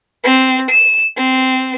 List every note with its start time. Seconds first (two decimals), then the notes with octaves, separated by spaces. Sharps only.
0.24 C4
0.71 E7
1.16 C4